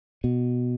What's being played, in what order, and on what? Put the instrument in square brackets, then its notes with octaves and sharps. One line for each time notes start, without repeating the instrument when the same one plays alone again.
[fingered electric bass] B2